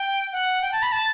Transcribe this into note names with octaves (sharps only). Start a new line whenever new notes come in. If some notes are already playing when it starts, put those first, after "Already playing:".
Already playing: G5
F#5
G5
A5
B5
A5